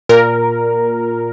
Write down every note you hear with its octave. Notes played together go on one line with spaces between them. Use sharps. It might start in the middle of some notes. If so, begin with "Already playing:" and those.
A#2 A#4